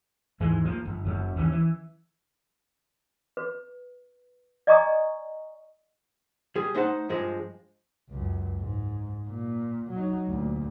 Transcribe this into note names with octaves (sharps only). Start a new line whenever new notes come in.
D#2 G#2 E3 G#3
F3 F#3 A#3
G1
F#1 F#2
D#2 E3 C#4
E3
B4
D5 D#5 G#5 A#5 C#6 D#6
G3 G#4
A3 D#4 C5 F#5 A5
G2 F3 G#3
C#2 F#2
G#2
A#2
F#3 D#4
D2 A#2